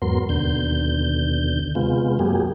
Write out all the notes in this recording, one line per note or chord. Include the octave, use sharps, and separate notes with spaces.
E2 G#2 F#3 B3 A#4 C6
D#2 B2 D3 G6
C3 G#3 B3 F4
F#2 F#3 A#3 G4 G#4